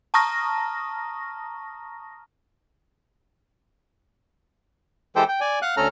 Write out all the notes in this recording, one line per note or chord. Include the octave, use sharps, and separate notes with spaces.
A5 A#5 C#6 D#6 F6 A#6
E3 G#3 G4 A4 C5 G5
G5
D5 G#5
F5 F#5 F#6
D2 C#4 A4 A#5 F6